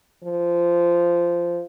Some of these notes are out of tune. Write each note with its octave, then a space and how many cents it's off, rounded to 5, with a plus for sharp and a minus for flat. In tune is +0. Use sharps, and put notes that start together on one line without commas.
F3 -15